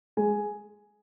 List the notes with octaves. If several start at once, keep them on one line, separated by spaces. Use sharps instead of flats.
G#3 G#4 G#5